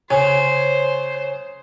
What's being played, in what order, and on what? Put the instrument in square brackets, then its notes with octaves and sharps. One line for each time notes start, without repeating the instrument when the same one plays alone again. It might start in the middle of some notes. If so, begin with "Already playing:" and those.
[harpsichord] C#3 [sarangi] C5 [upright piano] G#5